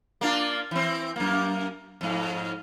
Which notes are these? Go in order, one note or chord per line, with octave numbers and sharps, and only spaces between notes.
A#3 D4 F4
E3 C4
F#2 A#3
F2 G#2